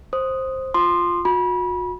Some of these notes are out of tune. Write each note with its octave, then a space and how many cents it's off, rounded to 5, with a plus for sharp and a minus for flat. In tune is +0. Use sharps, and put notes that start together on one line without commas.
C5 +10 D#6 +0
F4 +0 C6 +0 D#6 -45
F#4 -40 B5 -30